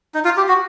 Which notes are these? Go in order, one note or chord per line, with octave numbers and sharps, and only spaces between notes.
D#4
F4
G4
F#4